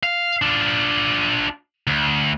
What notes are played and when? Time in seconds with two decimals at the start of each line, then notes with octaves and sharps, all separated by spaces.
0.03 F5
0.42 D4 F4
1.87 D2